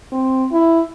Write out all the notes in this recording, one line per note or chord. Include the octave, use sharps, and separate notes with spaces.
C4
E4